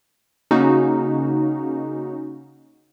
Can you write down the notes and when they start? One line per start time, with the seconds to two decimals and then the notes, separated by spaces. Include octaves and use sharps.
0.51 C#3 A#3 C#4 D#4 F#4